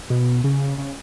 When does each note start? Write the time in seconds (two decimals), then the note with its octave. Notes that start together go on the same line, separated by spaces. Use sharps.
0.10 B2
0.44 C#3
0.78 C#3